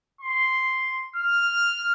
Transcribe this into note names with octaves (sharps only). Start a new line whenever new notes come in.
C6
F6